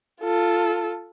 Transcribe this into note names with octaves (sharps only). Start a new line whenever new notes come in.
F4 A4